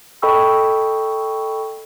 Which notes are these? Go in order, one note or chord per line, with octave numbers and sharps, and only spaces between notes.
A4 D#5 G5 B5 C#6 E6